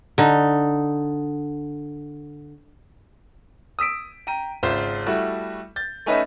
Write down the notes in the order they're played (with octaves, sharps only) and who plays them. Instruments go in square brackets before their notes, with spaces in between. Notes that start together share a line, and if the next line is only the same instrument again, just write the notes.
[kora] D3 D#4
[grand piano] D#6 E6 B6 D7
G5 A#5 D#7
G#1 C#3 F4 C5 E5
G3 A3 E4 F#4
G6 A6
A3 C#4 D#4 B4 D#5 E5